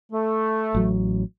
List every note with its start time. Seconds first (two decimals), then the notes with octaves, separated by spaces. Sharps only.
0.11 A3
0.75 A1 F#3